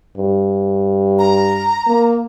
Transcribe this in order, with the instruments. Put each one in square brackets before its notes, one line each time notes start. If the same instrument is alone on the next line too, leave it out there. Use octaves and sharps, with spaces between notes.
[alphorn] G2
[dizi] A#5
[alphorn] A#3